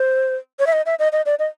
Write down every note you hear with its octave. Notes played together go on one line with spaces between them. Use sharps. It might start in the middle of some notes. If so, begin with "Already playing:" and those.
Already playing: C5
C#5
E5
D#5
E5
D#5
D#5
D5
D#5